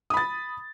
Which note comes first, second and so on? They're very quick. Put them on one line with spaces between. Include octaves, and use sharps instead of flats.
D#6 B5 A6